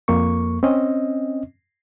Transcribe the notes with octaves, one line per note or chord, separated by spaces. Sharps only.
F2 A#3 C#6
C4 C#4 D#5